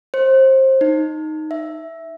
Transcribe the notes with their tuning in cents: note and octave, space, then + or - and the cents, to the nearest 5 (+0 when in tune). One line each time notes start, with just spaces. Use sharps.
C5 +25
D#4 +0
E5 +0